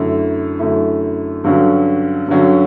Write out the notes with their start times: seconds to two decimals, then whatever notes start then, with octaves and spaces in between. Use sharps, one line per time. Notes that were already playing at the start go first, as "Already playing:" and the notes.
Already playing: F#2 D3 A3 E4
0.59 F#2 D3 A3 E4
1.44 G2 D3 F#3 C#4
2.28 G2 D3 F#3 C#4